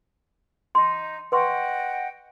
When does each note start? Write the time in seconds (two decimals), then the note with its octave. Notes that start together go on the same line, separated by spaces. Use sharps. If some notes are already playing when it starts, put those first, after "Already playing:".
0.75 D#4 C6
1.32 B4 D#5 F#5 G5 C6 C#6